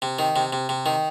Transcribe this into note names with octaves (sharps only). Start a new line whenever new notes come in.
C3
D#3
C3
C3
C3
D#3